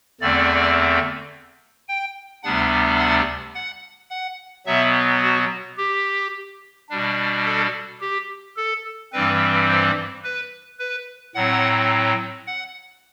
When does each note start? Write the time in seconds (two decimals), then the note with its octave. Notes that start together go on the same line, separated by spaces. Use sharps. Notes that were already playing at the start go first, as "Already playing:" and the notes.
0.21 E2 D3 A3 C4 D5
1.89 G5
2.43 D2 C3 G3 B3 D4 F#5
2.99 F#5
3.55 F#5
4.11 F#5
4.66 B2 F#3 B3 E5
5.22 F#4
5.78 G4
6.90 B2 G3 D4
7.45 A4
8.01 G4
8.57 A4
9.13 G2 E3 G3 C4 B4
9.69 C5
10.24 B4
10.79 B4
11.35 A2 F#3 C4 F#5
12.47 F#5